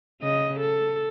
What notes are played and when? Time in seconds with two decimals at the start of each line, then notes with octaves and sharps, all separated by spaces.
0.22 C#3 D#5
0.60 A4